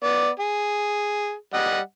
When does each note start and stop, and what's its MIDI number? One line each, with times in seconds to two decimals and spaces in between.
0.04 0.29 59
0.04 0.29 74
0.40 1.33 68
1.54 1.78 55
1.54 1.78 75
1.54 1.78 78